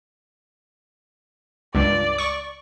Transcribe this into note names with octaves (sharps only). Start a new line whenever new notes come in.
C#2 G2 D5
C#6